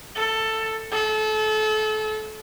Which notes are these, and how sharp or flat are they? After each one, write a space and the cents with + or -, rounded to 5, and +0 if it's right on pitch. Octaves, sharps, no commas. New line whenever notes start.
A4 +10
A4 -30